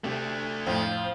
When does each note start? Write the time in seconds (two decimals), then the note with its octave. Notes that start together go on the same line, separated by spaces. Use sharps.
0.04 C3 A3 D4
0.67 F2 A2 F3 C5